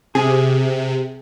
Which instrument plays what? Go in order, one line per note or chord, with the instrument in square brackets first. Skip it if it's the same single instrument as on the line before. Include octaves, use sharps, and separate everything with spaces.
[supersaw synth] C3 [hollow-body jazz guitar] G#4